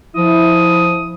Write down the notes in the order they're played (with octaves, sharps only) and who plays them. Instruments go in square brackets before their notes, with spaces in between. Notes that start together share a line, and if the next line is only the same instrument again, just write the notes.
[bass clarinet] F3 [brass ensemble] E4 [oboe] D#6